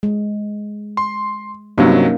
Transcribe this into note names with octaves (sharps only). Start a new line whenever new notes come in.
G#3
C6
G2 C3 F#3 A#3 C#4 D#4